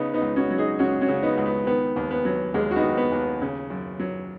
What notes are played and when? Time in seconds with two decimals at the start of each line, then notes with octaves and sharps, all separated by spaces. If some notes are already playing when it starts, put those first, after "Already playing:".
Already playing: C#3 B3 D#4
0.14 B3 D#4
0.22 C#2
0.36 C#4 F#4
0.51 F#3
0.58 D#4 G#4
0.79 C#2 C#4 F#4
1.01 C#4 F#4
1.08 C#3
1.23 B3 D#4
1.38 C#2
1.46 B3
1.67 D#3 B3
1.96 D#2
2.11 B3
2.25 F#3
2.54 D#2 G#3
2.71 F#4
2.76 B3 D#4
2.83 D#3
2.98 B3
3.12 D#2
3.42 C#3
3.70 F#2
3.99 F#3